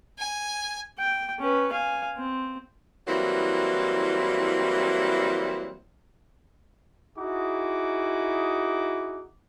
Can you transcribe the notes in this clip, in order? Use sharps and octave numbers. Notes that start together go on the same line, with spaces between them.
G#5
G5
C#4 B4
F5 G#5
C4
E3 F#3 G3 A#3 C4 E4
D#4 E4 F#4 G#4 D6